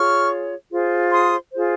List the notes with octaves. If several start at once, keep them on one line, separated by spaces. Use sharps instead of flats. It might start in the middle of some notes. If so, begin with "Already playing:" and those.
Already playing: F4 G#4 C#5 C#6 F6
F4 G#4 C5
C6 D#6
F4 G#4 C5